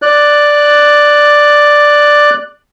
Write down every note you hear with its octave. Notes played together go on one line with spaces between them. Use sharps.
D5 F#6